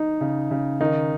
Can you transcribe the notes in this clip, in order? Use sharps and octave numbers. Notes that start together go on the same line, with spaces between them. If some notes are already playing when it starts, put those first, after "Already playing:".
Already playing: D#4
C#3
C#3
D#3 D#4